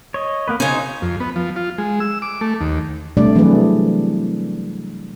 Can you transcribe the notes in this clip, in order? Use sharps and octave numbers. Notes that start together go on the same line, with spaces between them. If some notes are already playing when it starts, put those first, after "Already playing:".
C#5 D#5
A#3 B3 B4
C#3 C#4 D#4 C5
F2
B3
F3
F4
G#3
E6
D6
A3
D#2
C3 G3 A3 D4 D5
C3 E3 F#3 A3 G#4 B4